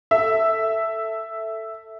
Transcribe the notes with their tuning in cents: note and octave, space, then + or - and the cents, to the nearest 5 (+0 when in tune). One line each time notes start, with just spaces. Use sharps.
A4 +10 E5 +0